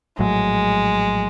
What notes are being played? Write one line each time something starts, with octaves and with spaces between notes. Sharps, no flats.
A#1 A2 F#3 G#3